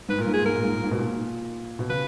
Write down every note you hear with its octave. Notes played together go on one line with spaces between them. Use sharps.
G#2 B4
A#2 A#4
G#2
A#2 G#4
G#2 A#4
A#2
G#2
A#2
G#2
B2
A#2
B2
C#3 B4